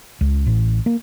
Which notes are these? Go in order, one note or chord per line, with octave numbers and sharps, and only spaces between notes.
C#2
A1
A#3